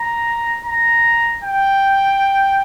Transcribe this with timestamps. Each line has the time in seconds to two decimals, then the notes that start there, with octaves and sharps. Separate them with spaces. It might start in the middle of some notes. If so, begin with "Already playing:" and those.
Already playing: A#5
0.66 A#5
1.44 G5